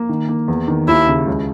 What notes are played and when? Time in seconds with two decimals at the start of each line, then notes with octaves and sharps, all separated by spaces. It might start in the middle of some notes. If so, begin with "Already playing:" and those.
Already playing: A#3
0.09 D#3
0.28 A#3
0.48 E2
0.68 D#3
0.88 D#2 E4
1.07 C#3
1.27 C#2